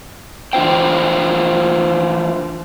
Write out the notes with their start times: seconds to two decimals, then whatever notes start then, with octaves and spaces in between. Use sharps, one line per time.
0.53 E3 D4 F4 C5 G5